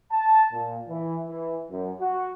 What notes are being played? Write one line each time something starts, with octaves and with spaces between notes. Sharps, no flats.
A5
A#2
E3
E3
F#2
F#4